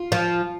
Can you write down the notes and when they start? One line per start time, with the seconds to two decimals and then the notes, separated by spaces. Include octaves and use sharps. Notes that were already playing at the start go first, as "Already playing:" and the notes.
Already playing: F4
0.12 F3